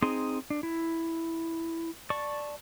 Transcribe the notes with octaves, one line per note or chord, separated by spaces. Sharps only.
C4 D#4 G#4 C6
D4
E4
D5 A5 C#6